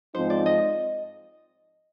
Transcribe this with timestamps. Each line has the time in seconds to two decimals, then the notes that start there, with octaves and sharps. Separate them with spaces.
0.14 G#2 F3 C4 D#4 C5
0.30 D5
0.46 D#5